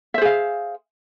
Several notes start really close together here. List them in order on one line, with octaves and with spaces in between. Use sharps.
E5 C5 G#4 F5